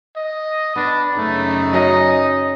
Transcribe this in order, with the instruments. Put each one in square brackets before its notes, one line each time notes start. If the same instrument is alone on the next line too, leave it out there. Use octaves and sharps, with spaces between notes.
[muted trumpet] D#5
[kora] B3 [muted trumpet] D4
[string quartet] F#2 C#3 D#4 [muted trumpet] A3
[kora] F#3 C#4 A#4 [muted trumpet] D#5